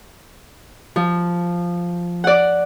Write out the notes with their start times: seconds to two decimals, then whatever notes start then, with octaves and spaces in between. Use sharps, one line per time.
0.96 F3
2.24 D5 F#5